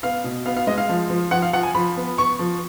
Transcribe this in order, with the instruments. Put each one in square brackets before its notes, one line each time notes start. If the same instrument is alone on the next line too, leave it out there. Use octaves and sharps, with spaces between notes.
[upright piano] B3 F5
B2
B3 F5
F5
G#3 D#5
F5
F3
F3
F3 F#5
F5
F3 F#5
G#5
F3 B5
B3
B3 C#6
F3